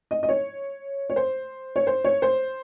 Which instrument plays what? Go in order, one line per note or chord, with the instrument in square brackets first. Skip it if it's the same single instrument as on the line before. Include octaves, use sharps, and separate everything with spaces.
[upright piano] D#5
D#5
C#5
C#5
C5
C#5
C5
C#5
C5